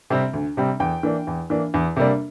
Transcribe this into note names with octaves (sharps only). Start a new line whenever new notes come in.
C3 G3 C4
D2
C3 G3 C4
E2 G5
E3 A#3 D4
E2
E3 A#3 D4
E2
C3 G3 A#3 D4